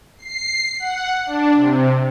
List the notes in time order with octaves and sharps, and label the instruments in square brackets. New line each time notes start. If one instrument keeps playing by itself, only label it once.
[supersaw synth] C7
F#5
D4
C3